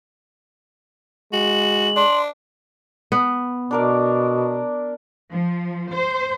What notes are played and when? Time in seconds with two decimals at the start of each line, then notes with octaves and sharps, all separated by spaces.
1.33 G#3 F#4 F#7
1.96 D4 C6
3.12 B3
3.71 B2 D4 A#4 D5
5.31 F3
5.92 C5